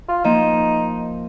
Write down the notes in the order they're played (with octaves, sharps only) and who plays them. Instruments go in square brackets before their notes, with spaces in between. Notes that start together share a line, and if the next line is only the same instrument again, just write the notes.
[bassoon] F4
[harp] F3 A#3 [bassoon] D#4